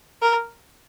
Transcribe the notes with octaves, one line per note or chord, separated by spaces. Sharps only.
A#4